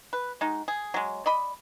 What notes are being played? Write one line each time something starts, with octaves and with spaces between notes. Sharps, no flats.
B4
G#3 D#4 F#4
G#4
F#3 G#3
D5 D#5 B5